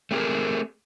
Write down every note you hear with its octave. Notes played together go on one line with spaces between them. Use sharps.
A3 C4 G4 G#4 A#4